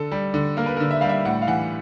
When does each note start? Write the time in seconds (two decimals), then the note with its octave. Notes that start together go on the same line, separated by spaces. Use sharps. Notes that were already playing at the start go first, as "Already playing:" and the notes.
Already playing: D3 A4
0.12 G3
0.34 D3
0.57 A#3 A#4
0.66 B4
0.77 D3 A#4
0.91 E5
1.01 G3 F5
1.09 E5
1.25 A2 F#5
1.42 F5
1.47 E3 F#5